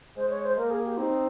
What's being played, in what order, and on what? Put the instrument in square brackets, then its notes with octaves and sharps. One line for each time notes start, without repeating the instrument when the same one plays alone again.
[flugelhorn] G#3 [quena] C5
[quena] C#5
C5
[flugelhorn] A#3 [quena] A#4
[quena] G#4
G4
[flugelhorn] C4 [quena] D#4